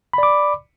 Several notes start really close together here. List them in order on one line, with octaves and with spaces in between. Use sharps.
B5 D5 D6